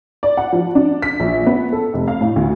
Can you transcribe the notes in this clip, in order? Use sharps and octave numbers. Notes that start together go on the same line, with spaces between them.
D5
F#5
F3
D4
B6
A#1
B3
A4
F1
F5
A2
D2